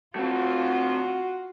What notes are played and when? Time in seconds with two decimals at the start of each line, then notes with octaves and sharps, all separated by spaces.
0.16 A3 C4 F4 F#4